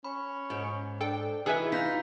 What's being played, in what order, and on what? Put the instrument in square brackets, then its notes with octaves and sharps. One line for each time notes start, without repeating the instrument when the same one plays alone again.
[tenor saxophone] C#4 [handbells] B5
[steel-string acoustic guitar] G#2
[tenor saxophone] D4 [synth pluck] A4 G5
[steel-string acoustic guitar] E3 [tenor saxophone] D#4 [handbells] F#4 G#5 E6 [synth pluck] G#4 B4 E5
[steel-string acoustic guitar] D#4 [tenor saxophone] F4 [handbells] G6 B6